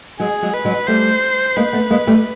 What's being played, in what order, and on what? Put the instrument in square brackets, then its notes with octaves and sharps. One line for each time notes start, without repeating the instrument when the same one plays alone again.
[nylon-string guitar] F#3 G#3 [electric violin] G#4
[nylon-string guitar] F#3 G#3
[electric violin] B4
[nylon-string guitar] F#3 G#3
[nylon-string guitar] G3 A3 [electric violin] C5
[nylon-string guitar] G#3 A#3 [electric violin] B4
[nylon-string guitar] A3 B3
G#3 A#3
G3 A3